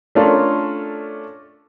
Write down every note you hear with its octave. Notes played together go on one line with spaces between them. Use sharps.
A3 C#4 D4 F4 A4 A#4